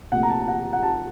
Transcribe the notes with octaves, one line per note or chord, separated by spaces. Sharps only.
C2 A#2 A3 F#5
A#5
A5
A5
F#5
F#5
A5